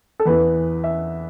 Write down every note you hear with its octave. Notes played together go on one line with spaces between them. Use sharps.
A4
E2 E3 B3 B4
E5